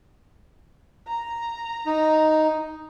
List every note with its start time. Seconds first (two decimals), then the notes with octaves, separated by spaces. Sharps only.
1.08 A#5
1.86 D#4